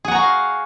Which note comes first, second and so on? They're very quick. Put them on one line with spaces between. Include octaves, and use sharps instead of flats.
G#4 F#5 A#5 F#4 F5